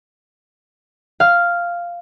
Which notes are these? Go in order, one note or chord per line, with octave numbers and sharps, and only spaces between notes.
F5 F6